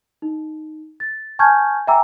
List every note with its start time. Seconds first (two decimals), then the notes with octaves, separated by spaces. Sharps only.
0.22 D#4
1.00 A6
1.39 G#5 A5 C#6 F6 G6 G#6
1.87 E5 G5 G#5 A#5 D6 E6